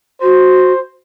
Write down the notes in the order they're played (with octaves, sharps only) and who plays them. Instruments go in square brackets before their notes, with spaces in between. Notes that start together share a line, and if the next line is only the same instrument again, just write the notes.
[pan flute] F#4 [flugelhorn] C5